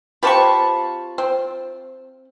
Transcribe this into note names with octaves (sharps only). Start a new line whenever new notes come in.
C4 F4 G4 B4 A5 C#6
C4